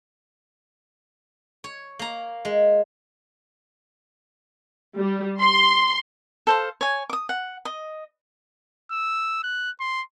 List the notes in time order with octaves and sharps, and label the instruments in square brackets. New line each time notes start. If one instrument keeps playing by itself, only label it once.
[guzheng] C#5
A#3 A#5
G#3
[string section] G3
C6
[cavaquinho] A4 C5 F5
C#5 G#5
D6 D#6
F#5
D#5
[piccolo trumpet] E6
F#6
C6